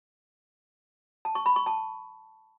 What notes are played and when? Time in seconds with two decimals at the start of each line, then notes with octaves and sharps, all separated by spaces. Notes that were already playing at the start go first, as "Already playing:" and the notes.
1.25 A5
1.35 C#6
1.46 B5
1.56 C#6
1.66 A5